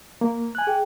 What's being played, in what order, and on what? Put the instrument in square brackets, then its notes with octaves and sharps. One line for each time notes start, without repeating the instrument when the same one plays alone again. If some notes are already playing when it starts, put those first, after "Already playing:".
[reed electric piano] A#3
G#5 F#6
[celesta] G#4 G5